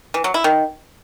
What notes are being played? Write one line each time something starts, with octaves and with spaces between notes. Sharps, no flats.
E3
F#3
E4
D#3